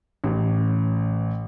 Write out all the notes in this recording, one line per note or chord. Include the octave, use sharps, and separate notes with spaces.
A1